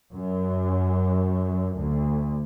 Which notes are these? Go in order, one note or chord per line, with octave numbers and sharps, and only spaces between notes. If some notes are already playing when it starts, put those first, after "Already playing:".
F#2
D2